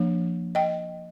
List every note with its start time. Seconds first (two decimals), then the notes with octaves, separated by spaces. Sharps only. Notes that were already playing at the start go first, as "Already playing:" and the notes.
Already playing: F3 A#3 D4
0.55 D#5 G5